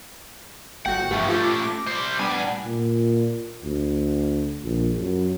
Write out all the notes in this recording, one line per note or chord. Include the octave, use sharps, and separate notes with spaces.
G1 F#4 F#5 G5
G2 E3 F3 A3 C#4 G4
F4 G4 A4
D6 A#6
G3 C5
A2 G3 B3 D4 G#5
A#2
D2
A#1
F#2